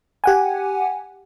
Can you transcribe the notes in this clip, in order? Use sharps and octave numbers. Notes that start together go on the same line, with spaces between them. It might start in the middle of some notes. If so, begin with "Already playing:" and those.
G4 F#5 G#5